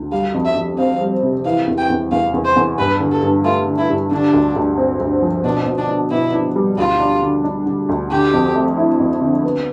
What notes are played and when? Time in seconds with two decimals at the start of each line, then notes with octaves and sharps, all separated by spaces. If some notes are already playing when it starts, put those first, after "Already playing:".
Already playing: D2
0.12 G3 F5
0.34 F2
0.45 E5
0.56 F2
0.78 C4 F5
1.01 G3
1.23 C3
1.45 E3 F5
1.67 E2
1.78 G5
1.90 E2
2.12 E2 F5
2.34 E2
2.45 C5
2.56 E2
2.78 G2 B4
3.00 D3
3.12 A4
3.23 G2
3.45 A3 F4
3.67 D3
3.78 E4
3.89 G2
4.11 D3 D4
4.33 D2
4.56 D2
4.78 C4
5.00 D2
5.22 F3
5.44 B2 D4
5.66 B2
5.78 D4
5.89 D4
6.11 B2 E4
6.33 D4
6.56 G3
6.78 D2 F4
7.00 D4
7.22 D3
7.44 D4
7.66 D3
7.89 D2
8.11 D3 G4
8.33 F2
8.55 A3
8.77 E4
9.00 F2
9.22 D3
9.44 B3